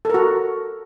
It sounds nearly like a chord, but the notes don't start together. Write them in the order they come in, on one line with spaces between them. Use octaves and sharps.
A4 A#4 F#4